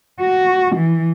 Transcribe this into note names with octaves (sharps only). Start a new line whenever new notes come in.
F#4
E3